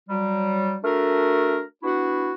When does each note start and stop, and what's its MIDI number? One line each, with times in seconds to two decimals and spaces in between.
0.09 0.75 54
0.09 0.75 55
0.84 1.61 57
0.84 1.61 62
0.84 1.61 66
0.84 1.61 70
1.83 2.32 59
1.83 2.32 62
1.83 2.32 64
1.83 2.32 66